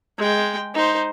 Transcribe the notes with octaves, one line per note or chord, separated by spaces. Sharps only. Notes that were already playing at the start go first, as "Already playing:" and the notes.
G#3 G5
D#4 C5